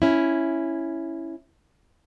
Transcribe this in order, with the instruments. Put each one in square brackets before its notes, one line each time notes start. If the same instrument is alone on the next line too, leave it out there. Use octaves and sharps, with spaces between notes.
[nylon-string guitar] C#4 E4